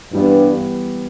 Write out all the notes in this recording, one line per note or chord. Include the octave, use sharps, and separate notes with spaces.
G2 E3 G3 B3